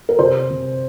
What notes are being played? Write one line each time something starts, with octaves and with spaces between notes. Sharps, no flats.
A#4
C3 C5
C3